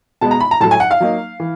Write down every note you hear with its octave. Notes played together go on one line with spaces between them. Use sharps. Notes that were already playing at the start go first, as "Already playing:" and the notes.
B2 G#3 B3 A5
A#5
B5
A#5
A2 F#3 A3 A5
G#5
F#5
F5
F#3 A#3 D#4
E3